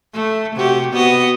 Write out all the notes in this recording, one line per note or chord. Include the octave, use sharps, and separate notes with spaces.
A3
C3 F#4 G4
B3 F#4 D#5